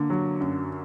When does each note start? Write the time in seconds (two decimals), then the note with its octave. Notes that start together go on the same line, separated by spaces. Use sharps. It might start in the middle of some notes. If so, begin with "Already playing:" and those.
Already playing: D3 A#3
0.10 F#3
0.41 F#2